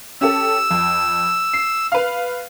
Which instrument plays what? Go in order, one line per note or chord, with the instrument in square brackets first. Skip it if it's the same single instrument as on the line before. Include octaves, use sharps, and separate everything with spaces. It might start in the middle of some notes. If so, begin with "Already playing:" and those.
[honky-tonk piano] C#4 G4 A4 [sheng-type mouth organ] E6
[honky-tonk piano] F2
C7
B4 F5